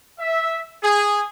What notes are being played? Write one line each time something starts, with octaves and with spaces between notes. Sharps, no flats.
E5
G#4